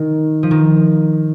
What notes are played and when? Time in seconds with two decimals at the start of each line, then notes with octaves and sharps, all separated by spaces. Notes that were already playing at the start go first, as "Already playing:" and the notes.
Already playing: D#3
0.43 F3
0.51 D#3